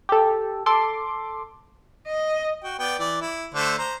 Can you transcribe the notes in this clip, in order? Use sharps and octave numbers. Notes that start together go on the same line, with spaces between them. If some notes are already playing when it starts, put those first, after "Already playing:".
G4 A4
A4 C6 D6
D#5
F#4 G5
B3 D5 G5
E3 D5
E4
D3 A3 C5
C5 A#5